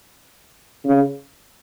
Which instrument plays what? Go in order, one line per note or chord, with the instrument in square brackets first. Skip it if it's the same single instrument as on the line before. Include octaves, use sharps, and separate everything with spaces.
[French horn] C#3